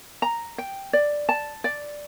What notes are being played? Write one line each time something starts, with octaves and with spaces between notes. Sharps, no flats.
A#5
G5
D5
A5
D5